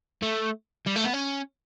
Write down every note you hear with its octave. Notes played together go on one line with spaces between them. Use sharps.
A3
G3
A3
B3
C#4